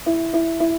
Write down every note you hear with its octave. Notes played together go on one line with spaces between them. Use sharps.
E4
E4
E4